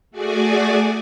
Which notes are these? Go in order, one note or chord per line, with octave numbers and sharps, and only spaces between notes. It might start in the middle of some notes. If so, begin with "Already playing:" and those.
A3 F#4 G#4 D5 G#5